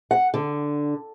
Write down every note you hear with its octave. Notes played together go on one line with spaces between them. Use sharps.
F#5
D3